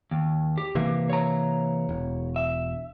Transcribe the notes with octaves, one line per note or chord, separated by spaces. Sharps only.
D#2
G4
C3 E3 A#3
C#5 A#5
E1
E5